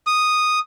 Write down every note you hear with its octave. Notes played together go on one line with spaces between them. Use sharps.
D#6